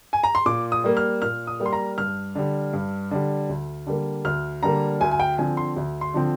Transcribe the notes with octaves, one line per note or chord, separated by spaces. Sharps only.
G#5
A#5
C6
A#2 D6
D#6
G3 A#3
F6
A#2 F6
D#6
G3 A#3
C6
A#5
G2 F6
D3 G3
G2
D3 G3
D2
D3 G3 A#3
D2 F6
D3 G3 A#3 A#5
D2 G#5
G#5
G5
D3 F3 C4 G#5
C6
D2
C6
D3 F3 C4